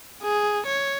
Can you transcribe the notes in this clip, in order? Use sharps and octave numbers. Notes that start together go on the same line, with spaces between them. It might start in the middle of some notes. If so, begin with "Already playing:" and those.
G#4
C#5